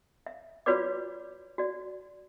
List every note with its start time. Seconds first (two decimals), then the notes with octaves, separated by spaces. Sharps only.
0.26 E5
0.66 F4 F#4 B4 C#5 D5 D6
1.58 F#4 D5